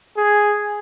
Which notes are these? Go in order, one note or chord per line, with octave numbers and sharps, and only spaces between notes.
G#4